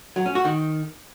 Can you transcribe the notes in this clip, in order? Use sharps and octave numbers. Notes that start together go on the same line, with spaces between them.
F#3
C#4
F#4
D#3